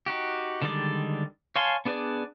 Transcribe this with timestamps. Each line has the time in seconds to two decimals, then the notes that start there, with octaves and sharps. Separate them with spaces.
0.06 D#4 F#4 G4
0.62 D3 D#3 G3 G#3 D5
1.56 C#5 F5 G#5 A5 C6
1.85 B3 D4 G#4 B4 D5